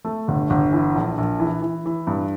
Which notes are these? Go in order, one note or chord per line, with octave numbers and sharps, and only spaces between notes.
A3
G1
G1
E3
A#1
A#1
E3
E3
E3
G2